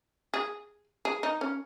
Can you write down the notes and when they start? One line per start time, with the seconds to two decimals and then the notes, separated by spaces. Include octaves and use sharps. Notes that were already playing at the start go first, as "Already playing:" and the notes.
0.34 G#4
1.05 G#4
1.23 D#4
1.41 C#4